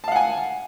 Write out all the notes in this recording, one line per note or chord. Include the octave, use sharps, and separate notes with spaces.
F5 F#5 G#5 A5